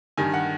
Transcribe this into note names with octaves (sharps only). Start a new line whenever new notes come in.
G2 D#3 G#5
F#5